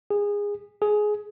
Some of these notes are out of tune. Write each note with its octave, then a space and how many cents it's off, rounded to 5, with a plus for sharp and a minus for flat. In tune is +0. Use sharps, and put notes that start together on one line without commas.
G#4 -20
G#4 +15